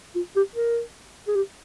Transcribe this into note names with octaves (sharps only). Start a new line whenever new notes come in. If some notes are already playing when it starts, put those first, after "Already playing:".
F4
G4
A#4
G#4
G4